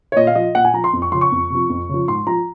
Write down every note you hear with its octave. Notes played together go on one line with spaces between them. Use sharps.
C#5
A#2 D#5
F5
F3 D#5
A#2 F#5
G#5
F3 A#5
C6
F2
C#6
C#3 F3 C6
C#6
F2
C3 F3
F2
C#3 F3
G#2 C6
F3 A#5